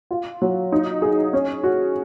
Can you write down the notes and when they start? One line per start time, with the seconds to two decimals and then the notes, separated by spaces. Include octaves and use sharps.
0.11 F4
0.42 F#3
0.72 D#4
1.02 G#4
1.33 C#4
1.63 F#4